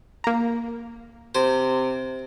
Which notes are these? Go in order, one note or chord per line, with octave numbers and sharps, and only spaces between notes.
A#3 A#5
C3 C5